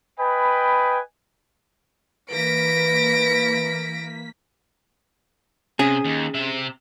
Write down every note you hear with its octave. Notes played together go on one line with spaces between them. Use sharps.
B4 D#5 G5 G#5 B5
E3 A#3 B4 A#6 B6 D7
C3 C#4 G#4
D#2
C3 E5